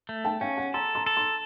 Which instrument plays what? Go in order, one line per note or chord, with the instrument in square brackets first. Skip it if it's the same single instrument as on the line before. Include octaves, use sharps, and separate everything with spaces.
[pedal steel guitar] A3
[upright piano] G5 A5
[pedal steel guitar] C#4 [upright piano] F5 G5
[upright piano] F#5 G#5
[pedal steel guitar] A4 [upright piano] A#5 C6
[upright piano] A#5 C6
[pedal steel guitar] A4
[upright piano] A#5 C6